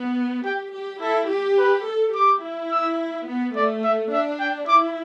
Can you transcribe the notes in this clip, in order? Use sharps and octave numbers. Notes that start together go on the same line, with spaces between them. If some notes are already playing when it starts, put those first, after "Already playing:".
Already playing: B3
G4 G5
G4
E4 A4
G4
B4
A4
G4 D6
E4
E6
B3
A3 D5
E5
D4 E5
G5
E4 D6